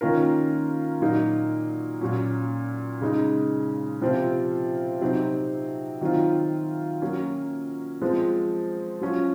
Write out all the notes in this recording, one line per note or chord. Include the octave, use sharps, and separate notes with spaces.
D#3 A#3 C#4 F4 A#4
A#2 F#3 A#3 D#4
A#2 F#3 C#4
C#3 G#3 D#4
C3 F3 C4 F4
C3 F#3 C4 D#4
D#3 F#3 C4 F4
F#3 A#3 C#4
F3 G#3 C4
F#3 C#4 F4